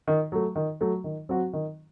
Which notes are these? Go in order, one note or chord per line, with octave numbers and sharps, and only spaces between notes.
D#3
F#3 A3
D#3
F#3 A3
D#3
F#3 C4 F#4
D#3